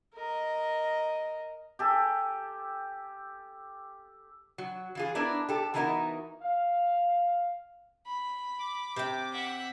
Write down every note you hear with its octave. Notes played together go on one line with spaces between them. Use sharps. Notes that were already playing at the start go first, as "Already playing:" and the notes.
A#4 D#5
G4 A4 G#5
F#3
E3 F4 G#4
B3 D4 E4 A#4
G4 A4
E3 B3 D#4 E4 F#4 A#4
F5
B5
D6
C3 G5
E5 F#5